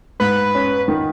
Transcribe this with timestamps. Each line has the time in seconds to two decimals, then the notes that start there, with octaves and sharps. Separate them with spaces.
0.20 G#2 B4
0.55 C#4
0.88 D#3